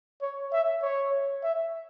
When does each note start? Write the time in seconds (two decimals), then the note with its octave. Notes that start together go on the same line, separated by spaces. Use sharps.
0.22 C#5
0.52 E5
0.82 C#5
1.44 E5